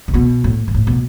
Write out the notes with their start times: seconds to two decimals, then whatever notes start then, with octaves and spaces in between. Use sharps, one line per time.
0.08 C3
0.14 B2
0.44 A2
0.68 G#2
0.74 A2
0.87 B2